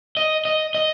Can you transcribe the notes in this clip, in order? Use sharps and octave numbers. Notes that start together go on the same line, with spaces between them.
D#5
D#5
D#5